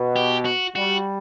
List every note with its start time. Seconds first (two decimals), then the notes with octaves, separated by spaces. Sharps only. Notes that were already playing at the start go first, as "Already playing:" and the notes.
Already playing: B2
0.16 G4
0.45 F#4
0.75 G3 F#4